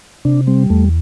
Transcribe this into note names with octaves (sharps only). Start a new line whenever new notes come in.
C3 D4
G3 C4
E2 A3